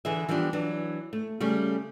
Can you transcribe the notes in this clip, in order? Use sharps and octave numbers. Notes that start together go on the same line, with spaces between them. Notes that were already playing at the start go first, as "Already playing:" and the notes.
D3 E3 G#4 E5
E3 F3 G3 B3 D4 G4
E3 F#3 D4
A3
C#3 G3 A3 C#4